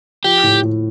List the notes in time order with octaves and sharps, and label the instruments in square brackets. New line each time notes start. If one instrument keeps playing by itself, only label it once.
[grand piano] F3 [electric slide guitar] G4
[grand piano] A2
A2